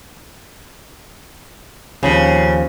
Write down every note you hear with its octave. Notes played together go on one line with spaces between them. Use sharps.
D#2 C#3 F3 C4